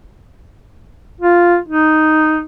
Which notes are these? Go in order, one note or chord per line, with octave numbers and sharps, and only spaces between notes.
F4
D#4